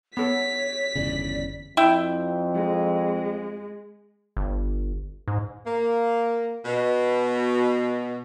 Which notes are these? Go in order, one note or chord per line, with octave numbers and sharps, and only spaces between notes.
B3 A4 C#5 B6
G1 E2 C#3 D5
F2 E4 E5 G5
G#3
G1
G#2
A#3
B2